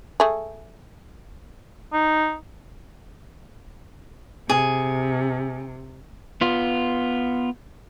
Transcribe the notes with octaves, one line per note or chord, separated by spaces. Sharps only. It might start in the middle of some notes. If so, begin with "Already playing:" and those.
A3 G#4
D#4
C3 G#4
B3 F4